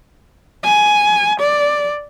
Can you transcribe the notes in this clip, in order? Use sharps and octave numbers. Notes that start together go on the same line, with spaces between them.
G#5
D5